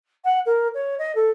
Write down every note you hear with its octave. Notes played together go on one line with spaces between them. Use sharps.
F#5
A#4
C#5
D#5
A4